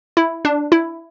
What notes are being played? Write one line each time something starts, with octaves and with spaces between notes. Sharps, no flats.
E4
D4
E4